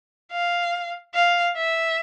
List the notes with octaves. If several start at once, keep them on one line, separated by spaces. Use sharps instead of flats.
F5
F5
E5